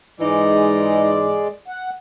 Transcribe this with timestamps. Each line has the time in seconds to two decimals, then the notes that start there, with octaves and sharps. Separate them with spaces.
0.20 G#2 E3 G#3 D#4 D5
1.68 F#5